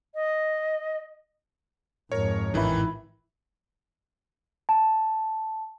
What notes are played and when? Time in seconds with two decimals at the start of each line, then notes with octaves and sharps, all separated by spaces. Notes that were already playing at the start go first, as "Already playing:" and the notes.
0.14 D#5
2.12 F2 G#2 A#4 C#5
2.54 A1 D#3 E3 E4
4.69 A5